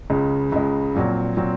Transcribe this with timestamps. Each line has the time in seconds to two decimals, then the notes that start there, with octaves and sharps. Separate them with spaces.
0.10 C#2 C#3 G#3
0.52 C#2 C#3 G#3
0.95 A#1 A#2 F#3 C4
1.37 A#2 F#3 C4